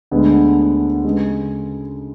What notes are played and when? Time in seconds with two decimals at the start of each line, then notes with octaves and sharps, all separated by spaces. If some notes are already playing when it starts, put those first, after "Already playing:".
0.11 D2 D3 G#3 B3
1.05 C#3 G#3